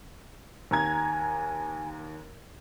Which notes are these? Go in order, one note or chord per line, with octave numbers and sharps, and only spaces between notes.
D#2 G#5 A#5 G#6